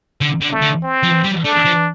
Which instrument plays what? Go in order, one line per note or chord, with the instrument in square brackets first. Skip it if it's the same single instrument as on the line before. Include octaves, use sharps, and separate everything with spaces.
[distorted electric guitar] D3
D3
[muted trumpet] A3
[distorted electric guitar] D3
[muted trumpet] C4
[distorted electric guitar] F3
G3
[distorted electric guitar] A3 [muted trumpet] D4
[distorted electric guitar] F3